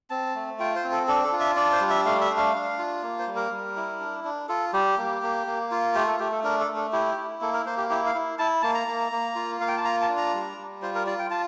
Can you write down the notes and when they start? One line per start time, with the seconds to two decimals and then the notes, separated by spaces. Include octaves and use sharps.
0.10 C4 A5
0.35 A3
0.59 F4 G5
0.76 C5
0.84 C4
0.92 A4
1.08 D4 A4
1.24 A4
1.32 F4
1.40 E5
1.56 D4 D5
1.72 C5
1.81 G3
1.90 E5
2.05 A3 F5
2.21 E5
2.30 D4
2.37 F5
2.55 D4
2.79 F4
3.03 A#3
3.19 C5
3.27 G3
3.36 A#4
3.51 G3
3.76 E4
4.00 D4
4.24 D4
4.49 F4 A4
4.73 G3 G4
4.98 A#3
5.23 A#3
5.47 A#3
5.71 F4
5.94 A3 G4
6.08 A4
6.19 A3 G4
6.32 A4
6.44 D4 A#4
6.60 A4
6.68 A3
6.76 A4
6.93 E4 G4
7.17 E4
7.41 A#3 A4
7.53 A#4
7.65 A#3 C5
7.77 G4
7.89 E4 G4
8.06 F5
8.15 E4
8.39 E4 A5
8.62 A#3 A5
8.75 A#5
8.87 A#3
9.12 A#3
9.36 F4
9.60 A#3 F5
9.68 G5
9.77 A5
9.84 F4 A#5
10.01 A5
10.09 D4
10.17 A#5
10.34 G3
10.57 G3
10.82 F4 C5
10.95 A#4
11.06 F4 D5
11.19 G5
11.30 F4 A5